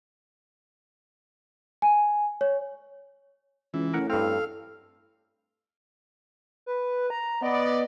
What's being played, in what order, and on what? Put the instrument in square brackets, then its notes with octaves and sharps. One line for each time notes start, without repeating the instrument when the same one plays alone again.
[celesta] G#5
C#5
[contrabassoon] C#2 [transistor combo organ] E3
[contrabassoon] A2 [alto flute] C#4 [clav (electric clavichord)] A#4 F#5
[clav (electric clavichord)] G2 C4 [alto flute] A4 [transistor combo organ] F5
[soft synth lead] B4
A#5
[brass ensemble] B3 D5 [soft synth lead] D#5